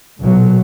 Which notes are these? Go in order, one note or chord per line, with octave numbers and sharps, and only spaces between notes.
B1 A#2 F#3